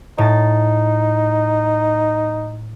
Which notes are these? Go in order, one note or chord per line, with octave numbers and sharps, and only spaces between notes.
A2 D#4 A6